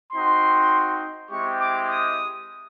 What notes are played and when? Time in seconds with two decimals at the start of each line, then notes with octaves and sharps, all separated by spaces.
0.13 C4 D#4 F#4 C6
1.30 G#3 C4 E4 G4 C#6
1.60 D6
1.89 D#6